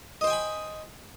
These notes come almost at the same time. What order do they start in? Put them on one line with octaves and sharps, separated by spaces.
D#5 C5 G5 G#5 B5